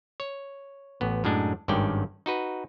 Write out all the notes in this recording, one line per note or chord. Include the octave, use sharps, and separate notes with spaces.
C#5
A1 B3
F#2 A2 G#3 D4
G#1 G2 D#3 C#4 D5 G5
D#4 F#4 B4